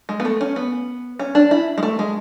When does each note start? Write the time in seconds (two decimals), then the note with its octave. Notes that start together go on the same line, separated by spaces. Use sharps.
0.09 G#3
0.20 B3
0.25 A3
0.41 C#4
0.56 B3
1.19 C#4
1.35 D4
1.51 E4
1.78 G#3
1.83 A3
1.99 G#3